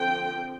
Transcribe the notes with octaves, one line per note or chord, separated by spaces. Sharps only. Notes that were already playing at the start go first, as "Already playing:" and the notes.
Already playing: D3 F3 C4 G5